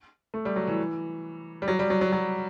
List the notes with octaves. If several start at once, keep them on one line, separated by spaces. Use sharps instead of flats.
A3
G3
F#3
E3
G3
F#3
G3
F#3
F#3
F#3